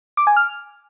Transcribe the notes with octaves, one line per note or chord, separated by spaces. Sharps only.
D6
G#5
F6